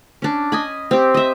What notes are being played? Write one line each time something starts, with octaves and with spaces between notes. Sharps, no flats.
C#4 D4
D#5 G#5 B5
C4 G4
D#5 E5